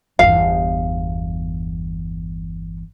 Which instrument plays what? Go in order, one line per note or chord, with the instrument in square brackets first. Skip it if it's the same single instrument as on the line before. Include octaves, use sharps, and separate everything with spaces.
[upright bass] G1 E2 [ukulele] F5